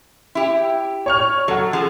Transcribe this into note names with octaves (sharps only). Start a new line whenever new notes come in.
E4 G4
C#5 C#6 F6
F#3 A4 F#5
F3 G#4